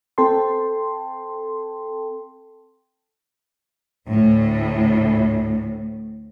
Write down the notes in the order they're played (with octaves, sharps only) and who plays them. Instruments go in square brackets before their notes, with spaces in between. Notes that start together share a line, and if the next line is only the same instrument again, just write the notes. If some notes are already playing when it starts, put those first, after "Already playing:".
[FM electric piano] C4 A4 G5 A5 C6
[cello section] D2 A2